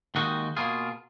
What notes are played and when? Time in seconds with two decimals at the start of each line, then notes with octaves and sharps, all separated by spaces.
0.15 D#2 D#3 G#3 D#4 F#4
0.57 B2 A#3 F4 G#4